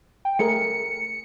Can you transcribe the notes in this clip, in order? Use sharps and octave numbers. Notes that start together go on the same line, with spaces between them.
G5
A3 G#4 A#4 C#7